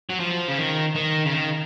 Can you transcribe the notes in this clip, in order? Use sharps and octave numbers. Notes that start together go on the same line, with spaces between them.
F#3
F3
C#3
D#3
D#3
C#3
D#3